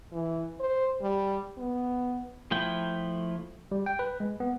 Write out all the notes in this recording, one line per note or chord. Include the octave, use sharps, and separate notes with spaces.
E3
C5
G3
B3
F3 A3 E4 G5
G3
G5
B4
G#3
B3